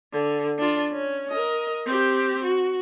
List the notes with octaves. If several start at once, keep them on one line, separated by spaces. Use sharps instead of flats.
D3
D4 F4
C#4
A#4 D#5
C4 G4
F#4